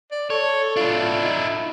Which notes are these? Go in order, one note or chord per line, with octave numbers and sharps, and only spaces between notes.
D5
A4 C#5
D4 E4 F4
D#4